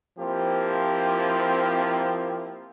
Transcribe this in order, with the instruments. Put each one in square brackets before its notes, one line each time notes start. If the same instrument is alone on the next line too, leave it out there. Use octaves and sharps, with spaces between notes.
[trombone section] F3 A#3 C4 E4 G4